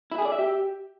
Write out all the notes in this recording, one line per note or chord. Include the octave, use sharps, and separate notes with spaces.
E4
G#4
D5
E5
G4